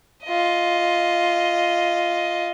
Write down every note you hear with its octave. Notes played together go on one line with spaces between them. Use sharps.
F4 D#5